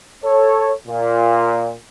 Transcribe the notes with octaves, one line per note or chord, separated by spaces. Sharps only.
A4 C#5
A#2